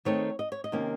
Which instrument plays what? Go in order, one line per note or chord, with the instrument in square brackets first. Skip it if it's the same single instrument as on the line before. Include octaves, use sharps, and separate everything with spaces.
[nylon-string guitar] D#3 A3 C4 D#4 C#5
D#5
C#5
D#5
C3 D#3 A#3 C#4